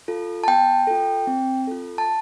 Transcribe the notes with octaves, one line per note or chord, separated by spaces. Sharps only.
F4 A4
A5
B3 G5
F4 A4
C4
F4 A4
A5